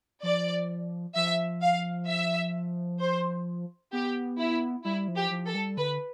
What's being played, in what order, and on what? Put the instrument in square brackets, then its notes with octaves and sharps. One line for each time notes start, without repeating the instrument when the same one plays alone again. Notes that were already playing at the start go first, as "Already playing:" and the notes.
[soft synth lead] F3 [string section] D5
[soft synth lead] F3 [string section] E5
[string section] F5
E5
C5
[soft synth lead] B3 [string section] G4
[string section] E4
[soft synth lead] G3 [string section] E4
[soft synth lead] F3
[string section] G4
[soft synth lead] F3
[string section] A4
[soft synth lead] G3
[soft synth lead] D3 [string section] B4